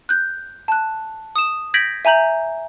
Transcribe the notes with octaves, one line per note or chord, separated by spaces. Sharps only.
F#6 G6
A5 F#6
D#6 E7
G6 G#6 A#6 B6 D7 F#7
E5 G#5 A#5 G6 F#7